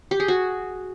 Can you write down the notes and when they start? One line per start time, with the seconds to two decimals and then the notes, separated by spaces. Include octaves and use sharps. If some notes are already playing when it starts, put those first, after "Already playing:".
0.11 G4
0.20 G#4
0.28 F#4